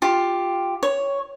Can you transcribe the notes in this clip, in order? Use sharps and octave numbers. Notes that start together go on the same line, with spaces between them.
F4 G4
C#5